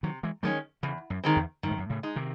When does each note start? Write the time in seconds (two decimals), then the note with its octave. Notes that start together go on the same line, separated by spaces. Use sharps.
0.03 C3 D#3 F#3
0.23 E3 G#3
0.43 D#3 F#3 G#3 A3 C#4
0.83 E2 C#3 E3
1.10 F#2
1.24 D#3 G#3 C4
1.36 E2
1.63 F#2 D#3
1.71 G#2
1.78 F#2
1.90 A2 C#3
2.03 G#3 D#4
2.16 C3 D#3